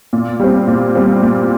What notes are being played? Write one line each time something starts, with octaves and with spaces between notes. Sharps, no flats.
A#2
G3 C4
A#2
G3 C4
A#2